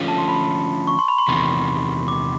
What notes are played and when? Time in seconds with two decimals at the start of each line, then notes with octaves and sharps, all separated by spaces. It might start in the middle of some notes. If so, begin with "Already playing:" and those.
Already playing: D3 F3 A3 C#4 F4
0.08 A5
0.18 C6
0.28 B5
0.87 C#6
0.99 C6
1.08 B5
1.18 C6
1.28 E2 C3 D#3
2.08 D6